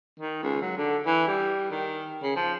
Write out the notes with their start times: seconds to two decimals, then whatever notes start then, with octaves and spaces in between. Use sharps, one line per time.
0.19 D#3
0.43 C#2
0.61 F#3
0.77 D3
1.06 E3
1.27 G3
1.71 D#3
2.22 C#3
2.36 F3